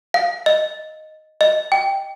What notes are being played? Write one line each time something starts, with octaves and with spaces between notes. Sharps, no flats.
F5
D#5
D#5
G5